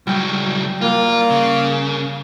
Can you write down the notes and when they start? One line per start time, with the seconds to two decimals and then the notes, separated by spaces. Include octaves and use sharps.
0.07 C#2 F#3 G3 G5
0.81 G2 G3 A#3 F4
1.30 C#3